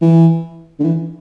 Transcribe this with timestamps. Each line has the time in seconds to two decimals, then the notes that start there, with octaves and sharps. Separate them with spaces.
0.02 E3
0.79 D3
0.84 E3